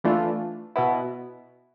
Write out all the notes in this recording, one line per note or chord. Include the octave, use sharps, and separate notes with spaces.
E3 A3 D4 F4
B2 B3 E4